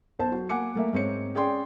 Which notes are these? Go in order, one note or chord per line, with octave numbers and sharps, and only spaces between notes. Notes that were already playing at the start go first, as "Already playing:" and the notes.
B1 C5 A5
F#3
A#3 F#5 G#5 D6 C#7
A3 A#3 E5
G#2 C4 C#5 C#7
C#4 G#4 D5 G5 C6